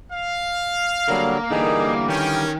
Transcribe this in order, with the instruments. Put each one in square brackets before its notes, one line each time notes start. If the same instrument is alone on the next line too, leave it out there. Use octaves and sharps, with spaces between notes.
[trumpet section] F5
[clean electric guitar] D3 [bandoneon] F#3 G3 [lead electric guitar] A#3 A#4
[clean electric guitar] D3 E3 G3 [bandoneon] D#4 G#4
[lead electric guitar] D#3 [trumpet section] C#4 G5 [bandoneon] A#4